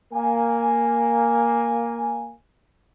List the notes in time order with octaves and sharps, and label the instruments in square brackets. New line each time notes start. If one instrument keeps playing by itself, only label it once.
[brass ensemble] A#3 G#5